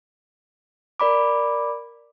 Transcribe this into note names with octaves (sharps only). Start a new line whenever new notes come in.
A#4 D5 B5 D6